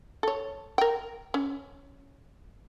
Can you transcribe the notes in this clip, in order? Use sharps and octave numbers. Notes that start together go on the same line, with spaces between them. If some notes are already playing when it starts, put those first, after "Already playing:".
A4 C#5
A#4 G5
C#4